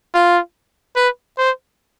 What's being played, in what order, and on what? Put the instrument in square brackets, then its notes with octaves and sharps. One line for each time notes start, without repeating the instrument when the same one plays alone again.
[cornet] F4
B4
C5